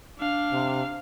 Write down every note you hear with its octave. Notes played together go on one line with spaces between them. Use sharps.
D4 F5
C3